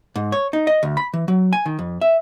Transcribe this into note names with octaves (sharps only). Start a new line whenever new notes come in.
G#2
C#5
D#4
D#5
D2
B5
E3
F#3
G#5
D#3
F2
E5